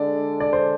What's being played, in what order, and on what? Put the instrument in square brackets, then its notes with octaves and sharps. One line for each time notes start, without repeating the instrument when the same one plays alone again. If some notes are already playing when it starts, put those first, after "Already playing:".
Already playing: [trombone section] D3 G#3 D4 [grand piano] D5
[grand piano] D5
C5